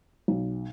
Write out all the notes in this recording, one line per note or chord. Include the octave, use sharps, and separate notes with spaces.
B1